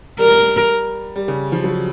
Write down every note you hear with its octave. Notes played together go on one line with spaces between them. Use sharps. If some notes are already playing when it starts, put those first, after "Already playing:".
G3 A#4
G3
C#3
F3
F#3